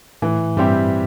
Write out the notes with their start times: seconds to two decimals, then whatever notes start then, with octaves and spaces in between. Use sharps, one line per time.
0.22 A2 E3
0.57 G2 G3 C4 E4 G4